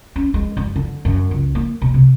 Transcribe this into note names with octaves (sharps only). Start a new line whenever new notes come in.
C#4
G#3
F#2
D3
F#2
C#2
A#3
B2
C3